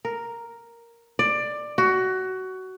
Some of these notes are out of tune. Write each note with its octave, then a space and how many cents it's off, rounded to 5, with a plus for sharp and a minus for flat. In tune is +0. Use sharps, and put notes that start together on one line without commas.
A#4 +0
D5 +15
F#4 +20